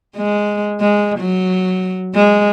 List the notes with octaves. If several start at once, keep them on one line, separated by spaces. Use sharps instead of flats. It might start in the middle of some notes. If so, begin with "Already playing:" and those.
G#3
G#3
F#3
G#3